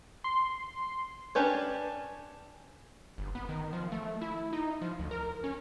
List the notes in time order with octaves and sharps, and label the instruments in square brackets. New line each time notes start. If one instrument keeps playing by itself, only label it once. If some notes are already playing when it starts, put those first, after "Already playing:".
[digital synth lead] C6
[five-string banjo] C#4 D4 G4 B4 C#5
[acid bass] G1
B3
D#3
F3
A3
E4
D#4
F3
D2
A#4
C#4